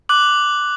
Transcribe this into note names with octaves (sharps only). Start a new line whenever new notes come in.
D6 F#6 F#7